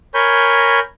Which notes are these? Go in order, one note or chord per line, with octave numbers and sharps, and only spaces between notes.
A#4 C#5 G#5 B5 G6